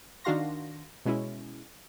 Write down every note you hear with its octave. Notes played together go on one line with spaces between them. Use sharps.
D#3 D4 F#4 F5 C6 A#6
B2 G#3 C#4 E4